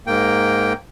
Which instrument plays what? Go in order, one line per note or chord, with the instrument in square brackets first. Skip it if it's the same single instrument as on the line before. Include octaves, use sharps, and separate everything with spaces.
[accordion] G#2 A#3 G5